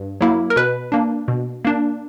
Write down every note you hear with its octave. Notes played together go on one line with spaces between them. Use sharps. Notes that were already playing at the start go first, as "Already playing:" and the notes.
Already playing: G2
F#3 A#3 E4
A#4
B2 B4
A#3 D4
B2
A#3 D4